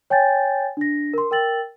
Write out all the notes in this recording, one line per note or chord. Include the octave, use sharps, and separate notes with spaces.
C#5 G5 G#5 G6 A6
D4 A#6
A#4 C6
A#4 G5 E6 A6 F#7